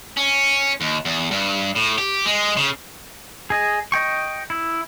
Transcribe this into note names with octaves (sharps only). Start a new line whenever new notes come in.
C#4
D#2
E2
G2
A2
G4
G#3
C#3
G#4 D#5
D#5 G5 C#6
E4